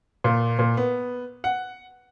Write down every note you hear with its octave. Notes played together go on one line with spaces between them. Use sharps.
A#2
A#2
B3
F#5